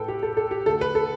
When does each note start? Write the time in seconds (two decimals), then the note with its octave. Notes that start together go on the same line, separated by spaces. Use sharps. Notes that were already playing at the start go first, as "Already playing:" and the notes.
Already playing: A2 A3 A4 B4 G5
0.08 G4
0.23 A4
0.37 A4
0.51 G4
0.66 D2 D3 A3 A4
0.81 B4
0.95 A4